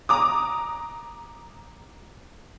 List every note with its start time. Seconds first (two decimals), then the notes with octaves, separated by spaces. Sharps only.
0.09 A#5 D6 D#6